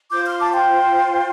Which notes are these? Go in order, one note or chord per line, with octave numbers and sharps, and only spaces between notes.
F4 C5 D6 G6
C6 F6
A5 D6
G5 C6